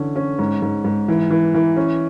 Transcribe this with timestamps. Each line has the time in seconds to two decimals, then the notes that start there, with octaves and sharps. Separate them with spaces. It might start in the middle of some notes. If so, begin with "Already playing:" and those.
Already playing: D3 E3 C#4
0.16 C#4
0.39 G#2
0.62 G#2
0.84 G#2
1.08 E3
1.30 E3
1.54 E3
1.77 C#4